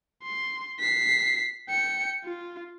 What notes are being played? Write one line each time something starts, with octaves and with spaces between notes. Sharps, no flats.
C6
B6 C7
G5 C#7
F4